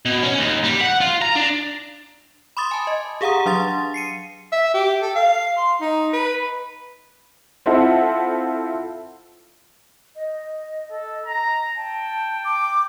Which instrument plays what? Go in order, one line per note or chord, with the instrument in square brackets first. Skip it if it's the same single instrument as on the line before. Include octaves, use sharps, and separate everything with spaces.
[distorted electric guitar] B2
C#4
D#2
G3
F#5
F4
A#5
D4
[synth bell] B5 C6 D6 D#6 A6
G#5 A5
D#5
G4 G#4 F5 F#5 A#5 D#6
F#3 D4 F5 C6 A6
C7 C#7 D#7
[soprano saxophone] E5
G4
A4
F5
C6
D#4
B4
[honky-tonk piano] C4 E4 F4 A4 E5 F#5
[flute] D#5
[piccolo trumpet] A4
A#5
[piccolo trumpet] G5 [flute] A5
[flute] D6